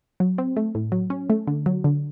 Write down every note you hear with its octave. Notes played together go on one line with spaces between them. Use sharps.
F#3
C4
A3
A2
F#3
C#4
A3
D3
F#3
D3